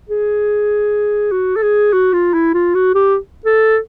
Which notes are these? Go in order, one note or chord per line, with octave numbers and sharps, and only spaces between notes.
G#4
F#4
A4
G#4
F#4
F4
E4
F4
F#4
G4
A4